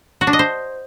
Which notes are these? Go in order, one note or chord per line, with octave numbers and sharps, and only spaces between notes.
F#4
D4
D#5
C5